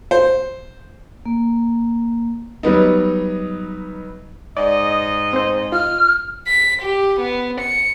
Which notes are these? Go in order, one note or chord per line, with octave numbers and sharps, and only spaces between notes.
C5
A#3
F#3 G3 B3 D#4
G#2 D5 D#5
C4 C5
F4 F6
B6
G4
B3
C#7